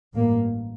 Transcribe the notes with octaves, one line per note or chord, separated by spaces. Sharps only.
A1 G2 A#3